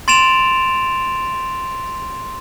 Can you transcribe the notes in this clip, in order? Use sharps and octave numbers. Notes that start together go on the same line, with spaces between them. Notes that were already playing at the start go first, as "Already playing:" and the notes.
C6 A6 D7 E7 F7